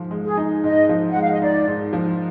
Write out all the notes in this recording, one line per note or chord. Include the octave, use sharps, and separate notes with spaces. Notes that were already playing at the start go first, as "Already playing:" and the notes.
Already playing: G#2 F3
G#3
G#4
D#4
G#2 D#5
F3
G#3 F#5
F5
D#5
D#4 D5
G#2
F3